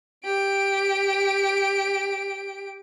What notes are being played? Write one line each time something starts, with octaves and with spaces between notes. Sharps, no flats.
G4 D7